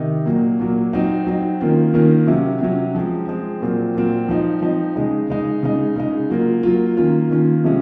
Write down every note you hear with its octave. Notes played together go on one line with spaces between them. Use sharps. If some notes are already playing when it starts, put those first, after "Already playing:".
Already playing: C3 D#3 D#4
A#2 F#3 A#3
A#2 F#3 A#3
F#3 C4 D#4
F#3 C4 D#4
D#3 A#3 C#4 F4
D#3 A#3 C#4 F4
C3 F#3 C#4
C3 F#3 C#4
F3 G#3 C4
F3 G#3 C4
A#2 F#3 C4 F4
A#2 F#3 C4 F4
F3 C4 D#4
F3 C4 D#4
C#3 G#3 D#4
C#3 G#3 D#4
C#3 G#3 D#4
C#3 G#3 D#4
F#3 A#3 F4
F#3 A#3 F4
D#3 A#3 C#4 F4
D#3 A#3 C#4 F4
C3 F3 G#3 C#4